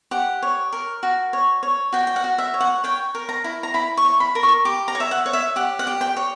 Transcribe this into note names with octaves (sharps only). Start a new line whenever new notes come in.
G4 F#5
C#5
A#4
F#4
C#5
C#5
F#4 G5
G5
F#5
F#4
E5
C#5
F#5
C#5 G5
A#4
A#5
E4
A#5
E4 B5
C#6
C#5
B5
A#4
C#6
G4 D6
A#5
C#5
E5
F#5
C#5
E5
G4 F#5
F#5
G4
G5
C#5